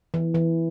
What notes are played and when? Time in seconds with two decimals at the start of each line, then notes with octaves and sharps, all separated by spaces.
0.14 E3
0.35 E3